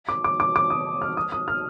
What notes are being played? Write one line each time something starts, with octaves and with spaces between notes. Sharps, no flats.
D6
D6
D6
D6
D#6
F6
D#6
D#6
F6